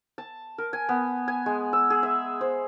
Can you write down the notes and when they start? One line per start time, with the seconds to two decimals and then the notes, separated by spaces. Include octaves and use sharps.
0.18 A5
0.58 A#4
0.73 G#5
0.89 B3
1.28 G#5
1.46 G#3
1.73 E6
1.90 G#4
2.03 E5
2.41 C5